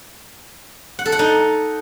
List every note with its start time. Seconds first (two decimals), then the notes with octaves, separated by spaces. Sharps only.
0.99 F#5
1.06 A4
1.12 F#5
1.19 D#4